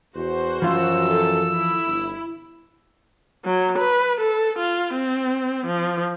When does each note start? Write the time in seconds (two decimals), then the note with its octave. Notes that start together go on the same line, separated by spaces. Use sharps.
0.15 E2 F#4 C5
0.62 F#2 E3 F3 F4 E6
1.09 A4
1.52 E4
1.86 G1
3.45 F#3
3.78 B4
4.19 A4
4.59 F4
4.94 C4
5.66 F3